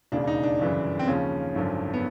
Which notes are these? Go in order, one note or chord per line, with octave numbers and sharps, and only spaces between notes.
E1 D#2 C#3 D4
D#4
D4
G1 F#2 C#3 E3
C4
D#2 C#3 F3 C#4
G#1 F#2 D3 F3
B3